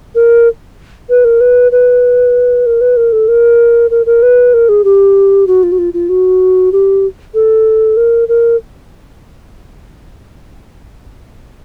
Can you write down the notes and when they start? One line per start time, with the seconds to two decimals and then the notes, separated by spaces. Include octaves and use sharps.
0.15 A#4
1.09 B4
1.24 A#4
1.41 B4
1.72 B4
2.66 A#4
2.81 B4
2.97 A#4
3.12 A4
3.28 A#4
3.91 A#4
4.06 A#4
4.23 B4
4.54 A#4
4.69 G#4
4.84 G4
5.47 F#4
5.63 F4
5.72 F#4
5.78 F4
5.94 F4
6.09 F#4
6.72 G4
7.34 A4
7.97 A#4
8.28 A#4